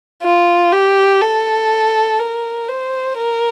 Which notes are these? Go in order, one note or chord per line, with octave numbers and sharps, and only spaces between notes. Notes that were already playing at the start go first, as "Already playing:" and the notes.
F4
G4
A4
A#4
C5
A#4